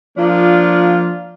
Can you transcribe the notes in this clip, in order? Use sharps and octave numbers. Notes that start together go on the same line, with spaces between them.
F3 A#3 D4 F4